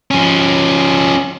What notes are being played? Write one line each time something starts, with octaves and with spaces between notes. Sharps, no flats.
F3 C#4